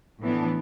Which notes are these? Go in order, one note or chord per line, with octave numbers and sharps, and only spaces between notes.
A2 E3 B3 D4